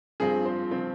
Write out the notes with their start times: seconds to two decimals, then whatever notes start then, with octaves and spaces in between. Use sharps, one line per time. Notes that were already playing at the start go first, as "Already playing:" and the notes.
0.20 G2 F3 C4 F4 G#4
0.45 C5
0.71 F3 C4 F4